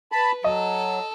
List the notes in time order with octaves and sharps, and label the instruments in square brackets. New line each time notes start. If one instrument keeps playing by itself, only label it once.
[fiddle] B4 [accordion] A5 B5
[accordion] F#3 [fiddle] A4 [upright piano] D#5